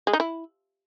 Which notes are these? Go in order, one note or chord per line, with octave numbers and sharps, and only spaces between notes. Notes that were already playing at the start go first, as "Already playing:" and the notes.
G#3
D#4
E4